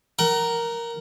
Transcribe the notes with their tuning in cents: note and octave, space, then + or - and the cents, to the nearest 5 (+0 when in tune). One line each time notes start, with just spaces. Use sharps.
A#4 +0 F#5 +35